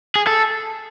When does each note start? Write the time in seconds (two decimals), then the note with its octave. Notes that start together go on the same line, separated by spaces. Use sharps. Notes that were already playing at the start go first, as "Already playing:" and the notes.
0.16 G#4
0.27 A4